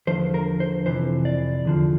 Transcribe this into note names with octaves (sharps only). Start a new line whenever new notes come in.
E2 D3 F3 C5
A#4
C5
F2 C3 E3 C5
D5
E2 D3 F3